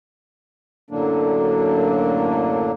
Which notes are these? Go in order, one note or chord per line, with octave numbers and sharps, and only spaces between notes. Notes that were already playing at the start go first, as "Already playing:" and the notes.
F#2 A2 D3 F#3 A#3 D4